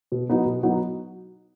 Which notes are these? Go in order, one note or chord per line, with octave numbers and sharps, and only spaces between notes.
B2
F#3 B3 D#4 F#4
B2
F#3 B3 D#4 F#4